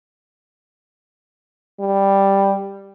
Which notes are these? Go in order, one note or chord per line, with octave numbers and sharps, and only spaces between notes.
G3